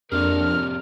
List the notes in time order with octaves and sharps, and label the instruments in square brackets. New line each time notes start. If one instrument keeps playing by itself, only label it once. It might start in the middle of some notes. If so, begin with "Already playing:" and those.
[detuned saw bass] F2 [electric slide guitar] C4 G4 G#4 [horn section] D4 A#4 [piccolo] F6